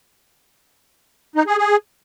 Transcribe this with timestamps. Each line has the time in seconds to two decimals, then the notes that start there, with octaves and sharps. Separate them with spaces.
1.36 D#4
1.47 G#4
1.58 G#4